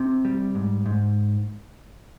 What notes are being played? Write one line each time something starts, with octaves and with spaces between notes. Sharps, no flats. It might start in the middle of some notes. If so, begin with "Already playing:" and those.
Already playing: C3
G3
G#2
G#2